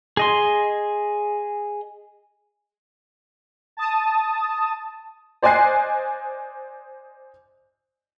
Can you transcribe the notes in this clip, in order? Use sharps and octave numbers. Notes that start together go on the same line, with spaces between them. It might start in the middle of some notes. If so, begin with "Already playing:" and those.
G#4 D#5 C6
A5 D#6
C5 D5 D#5 G#5 F#6 C7